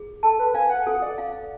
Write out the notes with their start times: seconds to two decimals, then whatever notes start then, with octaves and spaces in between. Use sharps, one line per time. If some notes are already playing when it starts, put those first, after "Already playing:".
Already playing: G#4
0.23 A4 A5
0.39 B4
0.54 F5 G#5
0.70 F#5
0.86 A4 F#5
1.02 D5
1.18 F5